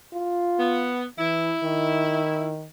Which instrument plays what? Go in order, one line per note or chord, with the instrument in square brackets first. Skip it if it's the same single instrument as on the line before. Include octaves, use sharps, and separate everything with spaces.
[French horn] F4
[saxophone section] B3
[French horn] E3 [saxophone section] E4
[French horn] D#3